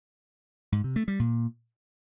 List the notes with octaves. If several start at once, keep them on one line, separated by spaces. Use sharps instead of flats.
G#2
C3
A3
G3
A#2